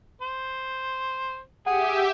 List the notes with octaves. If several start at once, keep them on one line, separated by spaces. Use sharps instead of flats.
C5
G4 G#4 E5 F#5